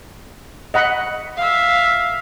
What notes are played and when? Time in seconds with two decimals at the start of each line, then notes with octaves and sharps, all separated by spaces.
0.74 D#5 F#5 B5
1.37 E5 F5